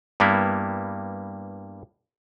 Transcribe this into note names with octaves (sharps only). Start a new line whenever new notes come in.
G2 G3 A#3 B3 E4